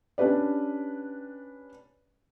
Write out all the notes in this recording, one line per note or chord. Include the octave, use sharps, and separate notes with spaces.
C#4 D4 G4 B4 D5